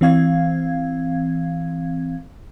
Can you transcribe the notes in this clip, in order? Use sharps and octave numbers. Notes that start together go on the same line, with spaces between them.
E3 C4 F5 G#6